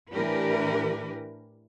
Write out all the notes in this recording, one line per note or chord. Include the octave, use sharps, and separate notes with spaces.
A2 E3 D4 G4 A#4 B4